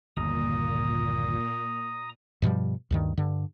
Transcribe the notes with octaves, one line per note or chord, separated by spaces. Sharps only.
G1 D#2 A#2 A#5 D#6
G2 B2 F3 G3
D2 G2 D#3
G2 D3